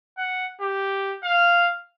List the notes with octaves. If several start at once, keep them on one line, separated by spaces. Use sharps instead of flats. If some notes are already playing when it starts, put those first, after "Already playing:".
F#5
G4
F5